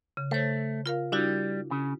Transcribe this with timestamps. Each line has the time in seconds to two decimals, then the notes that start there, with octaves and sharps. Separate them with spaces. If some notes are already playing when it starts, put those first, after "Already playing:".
0.17 C#3
0.31 A3 C5 C#5
0.86 F4 A#4 F5
1.12 G3 D4 E4 F#4
1.71 C#3